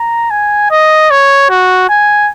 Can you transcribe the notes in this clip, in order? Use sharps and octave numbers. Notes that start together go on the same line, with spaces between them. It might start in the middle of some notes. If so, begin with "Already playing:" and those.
Already playing: A#5
G#5
D#5
C#5
F#4
G#5